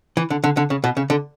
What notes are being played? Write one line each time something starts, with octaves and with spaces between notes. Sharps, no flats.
E3
D3
D3
D3
C#3
B2
C#3
D3